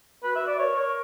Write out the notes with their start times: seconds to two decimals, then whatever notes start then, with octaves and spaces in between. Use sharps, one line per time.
0.23 F#4 B4
0.35 E5
0.47 D5
0.59 B4 C#5
0.63 A#4
0.77 C#5